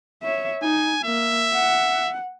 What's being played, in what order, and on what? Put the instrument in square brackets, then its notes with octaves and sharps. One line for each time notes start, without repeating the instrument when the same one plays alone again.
[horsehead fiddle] C#5 E5
[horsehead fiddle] D#4 [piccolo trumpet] G#5
[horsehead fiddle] A#3 [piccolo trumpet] E5
[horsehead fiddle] F#5